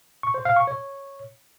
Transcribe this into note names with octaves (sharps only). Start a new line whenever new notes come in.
C#6
C5
F5
C#6
C#5